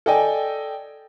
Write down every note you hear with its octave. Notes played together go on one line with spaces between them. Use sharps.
A4 D5 D#5 G5 G#5